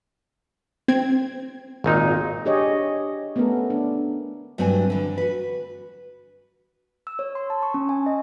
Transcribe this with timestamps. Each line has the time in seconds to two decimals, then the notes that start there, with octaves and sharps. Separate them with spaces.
0.88 C4 G#6
1.84 G#1 A#2 D#4
2.45 D4 G4 G#4 C#5 D#5
3.36 A3 B3 C#4 A4 A#4
3.70 D4
4.58 G2 F#3 A3 C4 D4 G#5
4.90 D3 E3
5.18 F#4 B4
7.07 E6
7.19 C#5
7.35 C6
7.50 A5
7.63 C#6
7.74 C#4
7.89 G#5
8.06 D#5